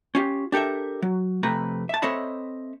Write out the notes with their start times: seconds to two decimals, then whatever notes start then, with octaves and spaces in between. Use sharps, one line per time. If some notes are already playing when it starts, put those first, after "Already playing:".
0.15 C#4 F4 G4
0.52 D4 G4 A4 A#4 E5
1.02 F#3
1.43 F2 C3 A3 B4 A#5
1.89 E5 A5
2.02 C4 A4 C#5 D#5 E5 B5